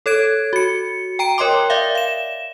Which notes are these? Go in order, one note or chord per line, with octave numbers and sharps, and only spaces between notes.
A4 C#5 G#6 D7
F#4 C#7
G5 A#5 D7
A#4 C#5 D#5 G5 C6 D6
D5 E5 F5
F5 E7